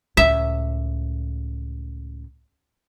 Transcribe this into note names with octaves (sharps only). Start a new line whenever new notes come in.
C#2 A2 E5